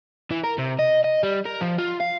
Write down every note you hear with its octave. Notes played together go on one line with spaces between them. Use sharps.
E3
A#4
C3
D#5
D#5
G3
A#4
F3
F4
F5